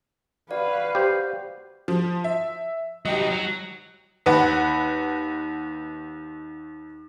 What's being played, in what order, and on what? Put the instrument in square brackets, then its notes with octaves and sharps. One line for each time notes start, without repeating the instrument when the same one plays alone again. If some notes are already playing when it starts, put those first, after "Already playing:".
[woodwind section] F#4 F5 [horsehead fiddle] B4 [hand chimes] D5
[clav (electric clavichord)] G4 C5
[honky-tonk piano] F3
E5
[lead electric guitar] F#3 D#4 [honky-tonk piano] F#4 G4 D#5
[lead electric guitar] F#3
[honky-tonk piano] D#2 B4 F#5